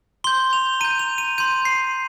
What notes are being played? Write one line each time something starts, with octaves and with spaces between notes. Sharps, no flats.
C6 G6 G7
F7
A#5 G6 D#7
F7
D#7
C6 G6 D#7
C7